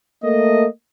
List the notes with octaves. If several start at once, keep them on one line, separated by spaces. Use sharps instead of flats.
A3 A#3 D#5